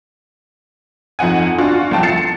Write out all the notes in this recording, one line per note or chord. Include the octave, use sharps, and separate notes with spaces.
F2 D#4 F#5 G#5
D4 F4 F#4
C2 F2 G5 A5
A6 C7 C#7 E7